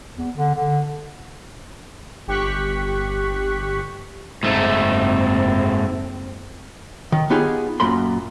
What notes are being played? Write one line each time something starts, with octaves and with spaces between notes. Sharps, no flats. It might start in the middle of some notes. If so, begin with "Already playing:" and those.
E2
D3
D3
G1 G4 C#6 F#6 B6
F#1 G#2 A3 C4
D#3
B3 D#4 F4 G4 G#4
F#2 A#2 B5 C6